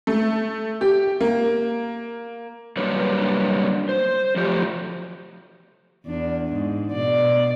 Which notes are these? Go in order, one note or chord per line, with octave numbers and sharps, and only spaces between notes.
A3
G4
A#3
F#3 G3 A#3 D4 B4 C#5
C5
F3 F#3 A3 G4
E2 D4
G#2
B2 D5